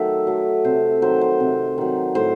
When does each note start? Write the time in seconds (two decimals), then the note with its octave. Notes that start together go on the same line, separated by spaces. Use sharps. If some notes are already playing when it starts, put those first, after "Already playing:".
Already playing: D#3 F#3 A3 E5
0.27 F#3 A3
0.64 C3 C5
1.02 D#3 F#3 C5
1.21 C5
1.40 C3
1.78 D#3 F#3
2.15 A2 C5